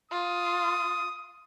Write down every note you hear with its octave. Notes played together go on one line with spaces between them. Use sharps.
F4 D#6